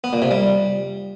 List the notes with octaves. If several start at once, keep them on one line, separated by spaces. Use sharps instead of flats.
B3
A#2
C3
G3